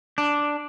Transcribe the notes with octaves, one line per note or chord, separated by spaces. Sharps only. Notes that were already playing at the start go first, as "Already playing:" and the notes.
D4